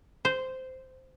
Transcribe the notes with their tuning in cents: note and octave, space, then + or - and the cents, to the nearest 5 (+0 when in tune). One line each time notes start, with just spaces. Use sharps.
C5 -10